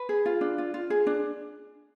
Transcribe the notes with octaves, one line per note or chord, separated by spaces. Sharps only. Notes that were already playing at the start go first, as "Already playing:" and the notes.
Already playing: B4
G#4
F4
D4
F4
F4
G#4
D4